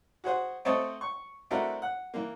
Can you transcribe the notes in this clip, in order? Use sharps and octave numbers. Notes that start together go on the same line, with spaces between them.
F#4 G#4 C5 F#5
A3 C4 C5 C#5 D#5 A5
C#6
A3 C4 D4 E4 F#4 A#4
F#5
E3 A#3